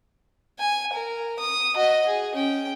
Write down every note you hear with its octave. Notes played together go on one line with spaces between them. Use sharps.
G#5
A#4
D#6
F#4 D#5
G#4
C#4 G5